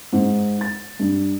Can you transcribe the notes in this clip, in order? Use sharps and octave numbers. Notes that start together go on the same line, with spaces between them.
G#2
A6
G2